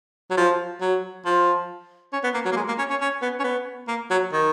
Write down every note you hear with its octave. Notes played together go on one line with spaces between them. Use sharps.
F#3
F3
F#3
F3
C#4
B3
A#3
F#3
A#3
G#3
A#3
C#4
C#4
C#4
B3
C#4
B3
A#3
F#3
D#3